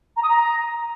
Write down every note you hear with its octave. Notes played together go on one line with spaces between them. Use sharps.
A#5
D#6
A#5